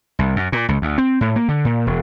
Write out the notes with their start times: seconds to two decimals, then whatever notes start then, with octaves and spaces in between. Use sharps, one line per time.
0.19 C2
0.36 F#2
0.52 A#2
0.69 C#2
0.82 D2
0.98 C4
1.21 A2
1.36 A#3
1.49 D3
1.65 A#2
1.87 E1